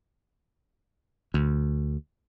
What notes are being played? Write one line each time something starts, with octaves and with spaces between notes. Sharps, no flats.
D2